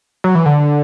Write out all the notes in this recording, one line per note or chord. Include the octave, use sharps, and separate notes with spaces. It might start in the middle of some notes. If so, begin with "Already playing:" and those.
F#3
E3
D3